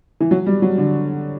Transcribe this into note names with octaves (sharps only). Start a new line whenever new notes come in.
E3
F#3
G3
F#3
D3